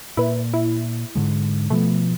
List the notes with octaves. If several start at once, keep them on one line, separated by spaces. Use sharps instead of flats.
A#2 E4 B4
E4
G#2 D3 G#3
B2 F3 A3 B3